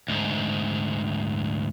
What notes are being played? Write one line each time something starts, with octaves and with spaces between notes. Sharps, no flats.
D2 G#2